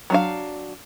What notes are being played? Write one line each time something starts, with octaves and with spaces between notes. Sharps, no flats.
F#3 D4 F5